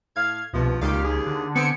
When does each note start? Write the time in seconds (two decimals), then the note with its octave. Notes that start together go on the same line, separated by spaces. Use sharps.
0.16 A2 F5 G#6
0.53 C2 G2 B2 F3
0.81 C#2 A#2 D#3 G3 G4 F5
1.03 D#2 G#4
1.26 D3
1.56 B3 C4 G#5 C#7 D7